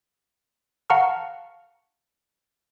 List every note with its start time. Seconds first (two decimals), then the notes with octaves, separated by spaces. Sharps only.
0.90 F5 F#5 A5 A#5 C#6 F6